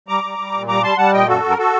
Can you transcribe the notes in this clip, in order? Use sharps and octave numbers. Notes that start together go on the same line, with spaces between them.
G3 A#5 D6
G3
G3
A#2
G3 A#5 D6
G3 A5 C6
G3 F#5 A5
A#2 D#5 G5
F#2 F#4 A4
F#2
A#4
F#4 A4